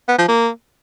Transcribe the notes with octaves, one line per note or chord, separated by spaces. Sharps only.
B3
F3
A#3